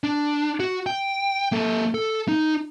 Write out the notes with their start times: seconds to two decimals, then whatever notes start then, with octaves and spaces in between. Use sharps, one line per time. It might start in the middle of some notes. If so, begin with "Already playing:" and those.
0.04 D4
0.60 F#4
0.87 G5
1.52 A#3 A4
1.94 A4
2.28 D#4